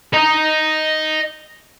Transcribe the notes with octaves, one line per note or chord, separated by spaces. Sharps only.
D#5 A#5